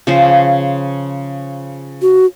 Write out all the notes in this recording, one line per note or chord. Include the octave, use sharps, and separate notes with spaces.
C#3 F3 C5
F#4